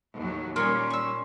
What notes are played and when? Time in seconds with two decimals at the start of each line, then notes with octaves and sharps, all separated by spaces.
0.16 D#2 A2 F#3
0.56 A#2 G3 C#4 A#4 C#5 G#5 C6 C7
0.90 C#6 E6